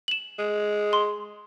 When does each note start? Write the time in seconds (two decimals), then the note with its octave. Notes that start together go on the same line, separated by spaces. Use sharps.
0.08 E7 F#7
0.38 G#3
0.93 C6